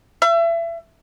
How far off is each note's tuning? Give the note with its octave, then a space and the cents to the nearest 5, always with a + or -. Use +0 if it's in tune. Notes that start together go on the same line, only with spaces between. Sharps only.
E5 +30